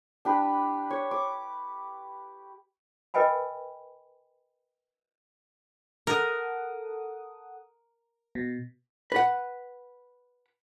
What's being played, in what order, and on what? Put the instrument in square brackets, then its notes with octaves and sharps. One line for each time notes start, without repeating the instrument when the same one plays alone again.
[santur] D4 G4 B4
C#5
D6
[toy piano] A#4 B4 D#5 G5 G#5 B5
[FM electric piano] A4 F#5 D#6 [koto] A#4
[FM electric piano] B2
[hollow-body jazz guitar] B4 F#5